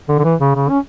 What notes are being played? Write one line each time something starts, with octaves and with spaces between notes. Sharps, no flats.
D3
D3
E3
C#3
C#3
C#4